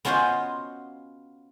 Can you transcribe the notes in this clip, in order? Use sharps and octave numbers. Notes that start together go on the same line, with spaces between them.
B3 C#4 F4 F#4 C5 D#5